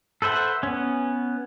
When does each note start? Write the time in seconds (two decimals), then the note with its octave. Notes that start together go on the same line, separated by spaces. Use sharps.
0.22 A4 B4 C5 E5 F#5
0.63 B3 C#4